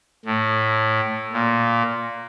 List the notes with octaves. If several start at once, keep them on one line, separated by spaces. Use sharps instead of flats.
A2
A#2